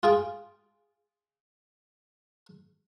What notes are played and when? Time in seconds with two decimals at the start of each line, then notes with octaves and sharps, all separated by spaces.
0.03 F4 G#4 G5